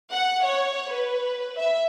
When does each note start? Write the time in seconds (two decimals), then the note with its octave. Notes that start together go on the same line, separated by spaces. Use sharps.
0.12 F#5
0.44 C#5
0.91 B4
1.58 E5